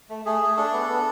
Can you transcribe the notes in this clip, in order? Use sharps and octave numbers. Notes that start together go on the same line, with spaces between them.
A3
A3 G#4
A3
D4 A4
B3
B3